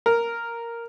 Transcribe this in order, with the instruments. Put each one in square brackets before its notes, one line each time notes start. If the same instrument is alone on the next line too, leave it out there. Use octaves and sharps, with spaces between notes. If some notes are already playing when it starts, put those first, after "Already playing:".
[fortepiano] A#4